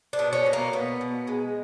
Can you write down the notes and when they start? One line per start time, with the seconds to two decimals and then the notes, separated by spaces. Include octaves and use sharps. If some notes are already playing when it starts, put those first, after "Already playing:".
0.13 D4
0.19 B2
0.33 C#4
0.46 B2
0.53 A#3
0.73 B2 B3
1.01 B2
1.27 G#3